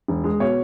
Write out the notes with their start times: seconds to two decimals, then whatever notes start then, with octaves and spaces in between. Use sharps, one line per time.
0.08 E1
0.24 G#3
0.40 B2 C#5